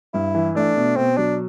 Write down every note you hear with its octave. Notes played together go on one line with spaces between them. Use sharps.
G2 E4
E3
A3 D4
B2
B2 C4
F#3 D4